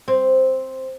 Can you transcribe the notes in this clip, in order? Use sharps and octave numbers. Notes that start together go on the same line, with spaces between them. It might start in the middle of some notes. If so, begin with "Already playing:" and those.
C4